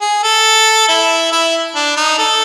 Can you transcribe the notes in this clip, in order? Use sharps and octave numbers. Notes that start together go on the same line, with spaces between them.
G#4
A4
E4
E4
D4
D#4
A4